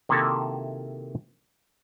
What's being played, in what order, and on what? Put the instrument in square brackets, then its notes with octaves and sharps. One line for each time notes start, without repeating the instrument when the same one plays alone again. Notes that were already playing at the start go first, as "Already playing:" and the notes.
[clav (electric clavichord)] C3 D#3 A#3 E4 F#4 A4